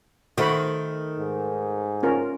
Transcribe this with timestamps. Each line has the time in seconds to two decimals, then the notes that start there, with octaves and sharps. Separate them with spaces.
0.38 D#3 A3 F#4 C5 B5
1.19 G#2
2.03 C#4 F4 A#4